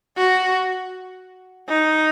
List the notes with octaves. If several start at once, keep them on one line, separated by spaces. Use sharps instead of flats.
F#4
D#4